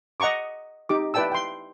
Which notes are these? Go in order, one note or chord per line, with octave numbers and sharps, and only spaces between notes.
D#5 F#5 A#5 C#6 D6
D#4 G4 D6
E4 B4 D5 G5 A5 E6
G5 C6